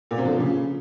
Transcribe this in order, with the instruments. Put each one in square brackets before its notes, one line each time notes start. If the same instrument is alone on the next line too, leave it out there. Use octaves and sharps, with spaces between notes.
[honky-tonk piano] A#2
C3
D3
F3
C#3